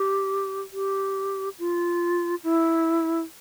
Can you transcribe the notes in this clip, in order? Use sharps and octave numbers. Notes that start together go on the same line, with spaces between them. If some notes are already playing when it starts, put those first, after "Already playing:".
Already playing: G4
G4
F4
E4